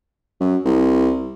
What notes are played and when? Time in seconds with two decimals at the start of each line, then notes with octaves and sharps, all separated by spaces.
0.41 F#2
0.65 C2